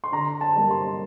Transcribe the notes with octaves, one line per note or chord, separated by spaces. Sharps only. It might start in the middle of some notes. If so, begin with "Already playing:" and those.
C6
D3 A#5
A5
G3 A#3
C6